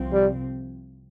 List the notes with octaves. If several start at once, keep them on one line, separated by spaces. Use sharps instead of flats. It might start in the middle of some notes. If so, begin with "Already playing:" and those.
Already playing: C2 C3 F3 C4
G3